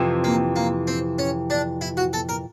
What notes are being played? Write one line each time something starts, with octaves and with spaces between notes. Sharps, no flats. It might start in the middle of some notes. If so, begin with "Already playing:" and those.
Already playing: F2 C3 E3
A#3
A#3
C4
C#4
D4
E4
F#4
A4
A#4